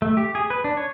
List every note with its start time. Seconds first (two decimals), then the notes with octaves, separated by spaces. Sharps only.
0.02 A3
0.17 G4
0.35 G#4
0.50 B4
0.64 D4
0.77 C#5